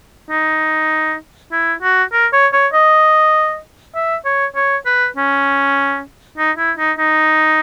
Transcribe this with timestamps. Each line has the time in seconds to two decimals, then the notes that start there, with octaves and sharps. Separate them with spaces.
0.30 D#4
1.52 E4
1.82 F#4
2.12 A#4
2.33 C#5
2.53 C#5
2.73 D#5
3.94 E5
4.25 C#5
4.55 C#5
4.85 B4
5.16 C#4
6.37 D#4
6.57 E4
6.78 D#4
6.98 D#4